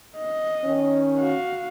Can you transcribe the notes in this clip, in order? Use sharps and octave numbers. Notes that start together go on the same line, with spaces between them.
D#5
D#3 C#4
F#4 F5